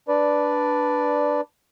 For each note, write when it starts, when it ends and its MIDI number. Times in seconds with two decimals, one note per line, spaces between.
0.08 1.41 62
0.08 1.41 71
0.08 1.41 74